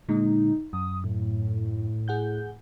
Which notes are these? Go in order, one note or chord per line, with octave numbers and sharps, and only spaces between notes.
A#2 D3 G#3 D#4
F#2 D#6
A2
G#4 F#5 G6